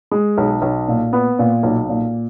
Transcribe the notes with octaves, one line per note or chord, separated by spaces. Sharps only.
G#3
B1
B1
A#2
B3
A#2
B1
A#2